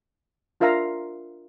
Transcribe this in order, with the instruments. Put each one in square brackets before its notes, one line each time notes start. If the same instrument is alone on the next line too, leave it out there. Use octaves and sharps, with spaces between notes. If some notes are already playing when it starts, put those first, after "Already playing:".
[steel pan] D4 F4 A#4 E5 F5 A#5